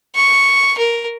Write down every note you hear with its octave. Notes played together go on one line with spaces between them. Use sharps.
C#6
A#4